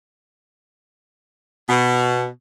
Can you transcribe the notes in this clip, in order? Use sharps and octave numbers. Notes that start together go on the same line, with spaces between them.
B2